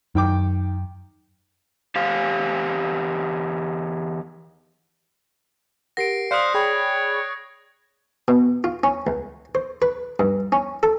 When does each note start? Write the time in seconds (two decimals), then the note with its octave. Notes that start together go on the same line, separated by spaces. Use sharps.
0.15 F#2 D#3 G5 D6
1.95 E2 G4 C5 F5
5.97 G4 A#4 F#5 A#6 C7 D7
6.31 C5 D5 F5 D#6 F6 F#6 B6 C#7
6.54 G#4 C#5 G5 B5
8.28 B2
8.64 F4
8.83 C#4
9.07 C#2
9.55 C5
9.82 B4
10.19 G2
10.52 C#4
10.83 A4